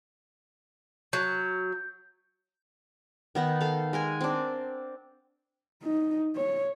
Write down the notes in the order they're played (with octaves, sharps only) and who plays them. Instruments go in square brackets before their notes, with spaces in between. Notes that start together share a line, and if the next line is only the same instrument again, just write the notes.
[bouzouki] F#3 [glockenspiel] G6
[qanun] D#3 B3 D#4
A4 F5
G#3 A#4 G#5
C4 D4
[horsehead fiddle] D#4
C#5